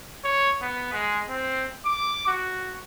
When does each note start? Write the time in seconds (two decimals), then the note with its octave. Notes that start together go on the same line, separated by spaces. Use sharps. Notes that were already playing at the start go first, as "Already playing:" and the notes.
0.24 C#5
0.62 B3
0.93 G#3
1.29 C4
1.85 D6
2.27 F#4